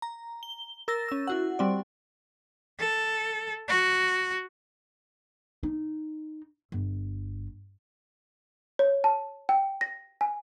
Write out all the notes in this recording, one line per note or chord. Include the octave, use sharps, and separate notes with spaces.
A#5
G7
A#4 E6 A6 A#6
C#4 E6
E4 F#4 F#5
G3 C4 D5
A4
F#4
D#4
G1
C#5
A5
G5
A#6
G#5